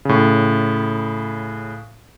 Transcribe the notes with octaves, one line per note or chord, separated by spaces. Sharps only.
A2 C#3